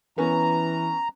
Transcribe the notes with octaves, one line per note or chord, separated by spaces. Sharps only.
E3 B3 C#4 A#5